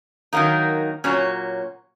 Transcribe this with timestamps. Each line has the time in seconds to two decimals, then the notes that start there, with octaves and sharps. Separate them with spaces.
0.33 D#3 F#3 A#3 D#4
1.04 A#2 F#3 C#4 F#4 C#5